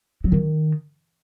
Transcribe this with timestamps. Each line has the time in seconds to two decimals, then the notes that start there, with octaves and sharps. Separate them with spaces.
0.24 F#3
0.32 D#3